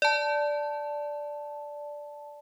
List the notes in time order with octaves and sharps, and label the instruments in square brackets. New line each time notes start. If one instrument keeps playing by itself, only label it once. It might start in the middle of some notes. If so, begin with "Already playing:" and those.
[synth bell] D5 A5